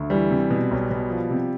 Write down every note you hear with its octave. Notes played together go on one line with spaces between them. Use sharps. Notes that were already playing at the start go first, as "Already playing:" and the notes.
Already playing: D2
E3 G3
C3
B2
B1
B2
F3
C3